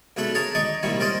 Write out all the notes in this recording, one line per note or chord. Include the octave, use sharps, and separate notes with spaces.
B1 C#3 A3 D4 E5 B5
G#4 A#4 C#5 A5 A#5
D#4 D5 D#5 C#6 D6
C2 A#2 D#3 G3 E4 C#6
C#4 A#4 C5 D5 D#5